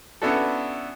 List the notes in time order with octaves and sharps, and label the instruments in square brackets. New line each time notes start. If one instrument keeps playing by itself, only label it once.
[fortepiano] B3 C#4 D4 E4 F#4 A4